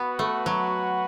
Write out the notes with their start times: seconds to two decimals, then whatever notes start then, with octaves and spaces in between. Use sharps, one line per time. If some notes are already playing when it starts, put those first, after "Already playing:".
Already playing: B3 F#4 B4 F#5
0.19 A3
0.46 F#3